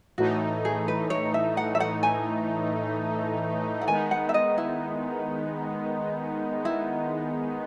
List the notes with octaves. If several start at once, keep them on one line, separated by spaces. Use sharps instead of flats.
A2 E3 A3 D#4 F#4
G#4
B4
C#5
E5
F#5
E5
F#5
G#5
F#5
D#3 G#3 B3 D#4 G#5
F#5
E5
D#5
E4
E4